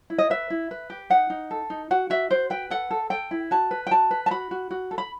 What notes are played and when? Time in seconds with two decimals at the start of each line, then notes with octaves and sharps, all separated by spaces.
0.10 E4
0.18 D#5
0.30 B4 E5
0.50 E4
0.71 B4
0.90 G4
1.10 D#4 F#5
1.30 D#4
1.51 A4
1.70 D#4
1.91 F#4 F#5
2.10 F#4 E5
2.31 F#4 C5
2.50 B4 G5
2.70 A4 F#5
2.91 A4
3.10 A4 G5
3.31 E4
3.51 F#4 A5
3.71 B4
3.87 G5
3.91 F#4 A5
4.11 B4
4.26 A5
4.31 F#4 B5
4.51 F#4
4.71 F#4
4.91 A4
4.98 B5